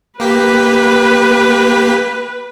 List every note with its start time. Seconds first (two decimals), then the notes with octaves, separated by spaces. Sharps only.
0.20 A#3 G4 B4 B6